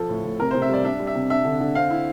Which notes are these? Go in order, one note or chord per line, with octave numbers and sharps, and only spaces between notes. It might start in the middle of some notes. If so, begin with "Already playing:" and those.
Already playing: F3 A4
A2
A2
C3 A#4
C5
C3
E5
G3 D5
D4 E5
G3
E5
C3
D4 E5
D3
D3
C4 F5
E4